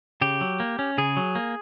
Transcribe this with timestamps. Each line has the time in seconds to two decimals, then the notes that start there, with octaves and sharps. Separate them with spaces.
0.21 C#3 G4
0.41 F#3
0.60 A#3
0.79 C#4
0.98 C#3 G#4
1.17 F#3
1.35 A#3